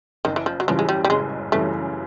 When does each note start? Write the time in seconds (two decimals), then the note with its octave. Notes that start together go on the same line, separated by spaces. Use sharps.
0.25 F#1 D#3
0.36 E3
0.46 F3
0.60 F#3
0.68 F#2 C#3 E3 F3 G3
0.79 G#3
0.89 G3
1.05 G3
1.10 F#1 G#3
1.52 F#2 C#3 E3 G3 A3